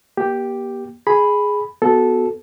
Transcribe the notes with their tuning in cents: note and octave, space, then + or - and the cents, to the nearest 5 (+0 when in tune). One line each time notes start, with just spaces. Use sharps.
A#3 +40 G4 +0
G#4 +0 B5 +0
B3 +0 F#4 +0 A4 -10